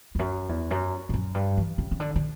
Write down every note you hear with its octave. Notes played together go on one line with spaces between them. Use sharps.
E2
F#2
E2
F#2
G2
F#2
G2
E3
C#3
C#3
D3
D3